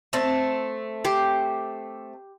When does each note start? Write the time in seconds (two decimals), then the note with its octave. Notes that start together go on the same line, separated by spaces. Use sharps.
0.13 A3 C4 A5
1.04 G4 C5